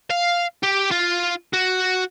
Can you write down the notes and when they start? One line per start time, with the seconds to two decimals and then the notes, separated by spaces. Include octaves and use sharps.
0.10 F5
0.63 G4
0.92 F4
1.53 F#4